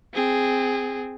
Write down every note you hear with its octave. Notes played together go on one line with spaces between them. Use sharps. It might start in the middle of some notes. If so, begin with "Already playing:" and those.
C4 G#4